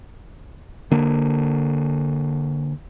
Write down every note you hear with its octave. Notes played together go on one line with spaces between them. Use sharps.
D3 A#3